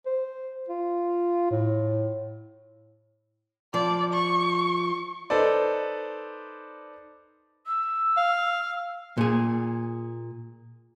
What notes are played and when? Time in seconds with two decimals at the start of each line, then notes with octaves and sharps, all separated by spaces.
0.06 C5
0.69 F4
1.51 A2
3.74 F3 D5
4.13 C#6
5.30 D#4 A4 B4 C5 D5
7.66 E6
8.17 F5
9.18 A#2 G#4